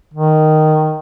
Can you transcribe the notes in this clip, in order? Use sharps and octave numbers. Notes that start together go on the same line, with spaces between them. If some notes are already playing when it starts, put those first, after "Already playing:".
D#3